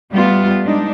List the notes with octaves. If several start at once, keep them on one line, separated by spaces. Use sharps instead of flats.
G3 A3 B3 F4
G#3 D4 D#4